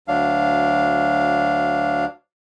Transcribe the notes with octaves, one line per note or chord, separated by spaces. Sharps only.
D2 F#3 D4 F5